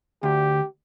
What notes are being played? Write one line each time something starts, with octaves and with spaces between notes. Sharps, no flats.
D2 G4